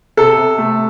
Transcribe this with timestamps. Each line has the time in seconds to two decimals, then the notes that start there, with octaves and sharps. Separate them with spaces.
0.17 C3 A4
0.37 C3
0.58 A3